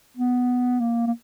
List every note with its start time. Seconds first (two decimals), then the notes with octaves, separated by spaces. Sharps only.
0.17 B3
0.80 A#3
1.07 A#3